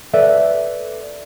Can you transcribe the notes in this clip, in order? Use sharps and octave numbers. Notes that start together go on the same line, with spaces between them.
A4 B4 D5 E5